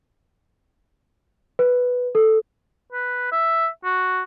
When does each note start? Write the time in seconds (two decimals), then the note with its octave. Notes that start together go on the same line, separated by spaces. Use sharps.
1.59 B4
2.15 A4
2.92 B4
3.32 E5
3.84 F#4